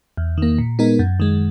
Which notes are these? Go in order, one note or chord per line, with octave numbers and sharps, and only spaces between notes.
E2
D#3 A#3
A#2
G#3 B3 D#4 A#4
F#2
D#3 G#3